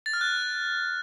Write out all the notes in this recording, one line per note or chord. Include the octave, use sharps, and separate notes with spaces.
A6
F6
F#6